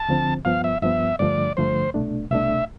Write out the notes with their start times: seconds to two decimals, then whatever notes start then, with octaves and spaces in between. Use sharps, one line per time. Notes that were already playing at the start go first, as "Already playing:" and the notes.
Already playing: A5
0.08 D2 D3 F3 C4
0.45 G2 F3 B3 F5
0.64 E5
0.82 G2 F3 B3 E5
1.19 G2 D3 F3 A3 D5
1.57 G2 D3 F3 A3 C5
1.94 C2 B2 A3 D4
2.31 C2 B2 A3 D4 E5